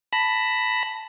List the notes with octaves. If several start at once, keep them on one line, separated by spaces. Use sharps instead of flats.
A5 B5 A#6